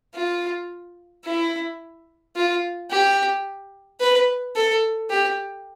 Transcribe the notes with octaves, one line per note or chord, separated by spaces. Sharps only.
F4
E4
F4
G4
B4
A4
G4